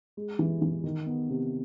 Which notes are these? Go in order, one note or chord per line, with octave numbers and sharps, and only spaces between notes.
G#3
E3
E3
D#3
B3
C3